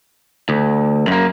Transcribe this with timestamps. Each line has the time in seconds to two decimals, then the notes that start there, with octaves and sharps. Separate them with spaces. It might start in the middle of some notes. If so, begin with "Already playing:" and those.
0.49 D2
1.07 F#2 A#3